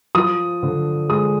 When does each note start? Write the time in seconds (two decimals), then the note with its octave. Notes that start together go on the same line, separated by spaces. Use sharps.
0.15 F3 D#6
0.63 D3
1.09 G#3 D#6